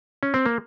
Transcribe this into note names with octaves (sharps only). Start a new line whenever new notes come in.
C#4
C4
A#3